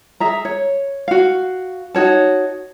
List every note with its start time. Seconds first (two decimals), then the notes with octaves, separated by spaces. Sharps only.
0.20 G#4 E5 A#5
0.45 C#5
1.08 F#4 F5
1.94 D#4 F#4 C#5 A5